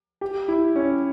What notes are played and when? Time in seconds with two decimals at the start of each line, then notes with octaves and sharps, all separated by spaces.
0.21 G4
0.48 E4
0.76 C#4